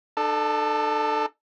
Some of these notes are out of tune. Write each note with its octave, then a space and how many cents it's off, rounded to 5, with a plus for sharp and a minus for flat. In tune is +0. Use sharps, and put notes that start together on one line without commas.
D4 +45 A4 +0